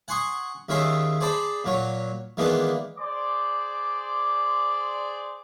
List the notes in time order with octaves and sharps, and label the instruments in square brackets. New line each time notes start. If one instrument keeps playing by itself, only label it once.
[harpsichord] F#5 G#5 C6 C#6 D#6
D#2 D#3 C#4 G#4 E5 C6
G#4 C5 D5 A5 B5 D6
A#2 F#3 C#5
D#3 E3 G#3 A#3 B3 D4
[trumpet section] G#4 C5 D5 C6 D6